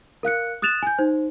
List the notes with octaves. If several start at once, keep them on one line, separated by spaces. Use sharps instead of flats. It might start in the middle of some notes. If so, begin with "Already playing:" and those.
A#4 F5 F#6 C#7
D#6 F#6 A6 E7 F7
G#5 G6
D#4 C5